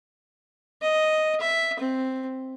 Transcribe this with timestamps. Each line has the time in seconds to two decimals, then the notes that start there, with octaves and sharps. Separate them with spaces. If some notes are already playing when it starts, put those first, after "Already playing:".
0.82 D#5
1.40 E5
1.79 C4